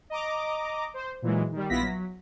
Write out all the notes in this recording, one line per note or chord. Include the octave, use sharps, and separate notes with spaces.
D#5 A#5 D6
C5
A#2 E3 F#3 G#3
D#3 G3
A#1 B3 E4 F4 A#6 B6
F#3